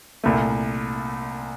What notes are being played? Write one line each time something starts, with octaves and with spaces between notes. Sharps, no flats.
C2 A#2 A3